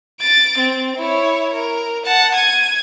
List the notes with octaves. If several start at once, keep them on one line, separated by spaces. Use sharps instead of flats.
A6 D7
C4
E4 C#5
A#4
F#5 A5
G#6 D#7